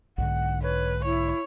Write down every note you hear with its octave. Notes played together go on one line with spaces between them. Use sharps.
B1 G#2 D3 F#5
B4 C#5
E4 C#5